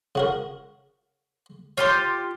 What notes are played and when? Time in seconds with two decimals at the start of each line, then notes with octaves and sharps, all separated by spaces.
0.15 C#3 F#4 A#4
1.78 F4 G4 C#5 C6